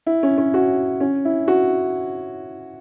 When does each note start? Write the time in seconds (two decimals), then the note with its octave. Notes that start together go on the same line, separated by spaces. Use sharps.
0.07 E4
0.23 C#4
0.38 C#4
0.54 F#4
1.00 C#4
1.25 E4
1.48 F#4